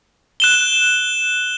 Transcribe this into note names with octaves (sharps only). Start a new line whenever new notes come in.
F#6 E7 G7